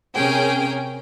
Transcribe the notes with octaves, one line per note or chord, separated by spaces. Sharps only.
C3 C#4 G#4 A#4 G5